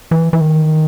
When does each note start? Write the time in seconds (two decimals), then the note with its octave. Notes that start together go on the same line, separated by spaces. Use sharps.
0.11 E3
0.33 E3
0.41 D#3